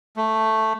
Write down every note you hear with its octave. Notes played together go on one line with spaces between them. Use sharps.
A3